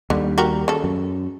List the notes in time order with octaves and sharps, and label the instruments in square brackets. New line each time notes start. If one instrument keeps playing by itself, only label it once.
[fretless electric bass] D#2 G3 [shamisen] D3
[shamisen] F#4 G4 A#4
C#3 A4
[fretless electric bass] F#2